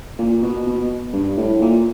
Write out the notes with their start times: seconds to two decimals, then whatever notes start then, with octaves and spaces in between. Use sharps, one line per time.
0.19 A#2
0.42 B2
0.66 B2
1.13 G2
1.37 A2
1.61 A#2